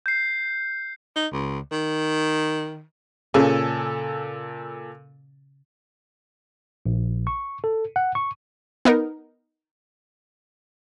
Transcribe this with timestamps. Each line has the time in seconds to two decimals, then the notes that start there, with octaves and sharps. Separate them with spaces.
0.06 G6 C7
1.16 D#4
1.32 C#2
1.72 D#3
3.34 A#2 C#3 A4 G#5
6.86 A#1
7.27 C#6
7.64 A4
7.96 F#5
8.15 C#6
8.85 B3 D#4 A#4